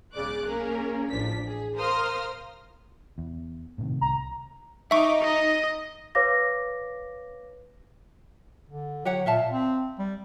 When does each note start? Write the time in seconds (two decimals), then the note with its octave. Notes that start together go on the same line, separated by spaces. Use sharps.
0.14 B1 G#2 C#3 D5 D6 F#6
0.46 A#3 C#4 G#4 A#4
1.10 A1 F3 D4 B6
1.46 G#4
1.76 A#4 C5 F5 C6 D#6 F6
3.18 E2
3.78 A2 C3 D#3
4.01 C2 A#5
4.91 D#4 E5 C#6 D6
5.22 D#5
6.15 B4 C#5 F5 D6 A#6
8.69 D3
9.05 F#3 G4 C#5 F#5
9.26 A#2 E5 F5 A5
9.50 C4
9.99 G3